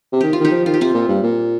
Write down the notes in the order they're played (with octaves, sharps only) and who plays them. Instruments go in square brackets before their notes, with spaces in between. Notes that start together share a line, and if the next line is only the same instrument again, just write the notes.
[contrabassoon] C3
[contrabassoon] D#3 [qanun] G4
[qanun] F4
[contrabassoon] D#3 [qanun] D#4 G4
[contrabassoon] F3
[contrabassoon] D#3 [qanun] F4
[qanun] G4
[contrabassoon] C3 [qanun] C4 F4
[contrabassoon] A#2
G2
A#2